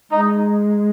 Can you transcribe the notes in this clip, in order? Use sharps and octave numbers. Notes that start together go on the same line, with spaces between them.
G#3 D#4